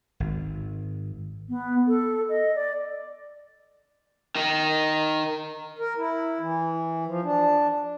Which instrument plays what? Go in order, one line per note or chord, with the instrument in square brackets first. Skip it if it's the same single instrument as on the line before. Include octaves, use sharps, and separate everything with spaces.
[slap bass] G#1
[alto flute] B3
A4
D#5
D5
[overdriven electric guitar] D#3 D#4
[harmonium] A#4
E4
E3
F3
D4